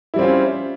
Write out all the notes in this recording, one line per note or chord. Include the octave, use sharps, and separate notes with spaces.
G3 C4 C#4 E4 F4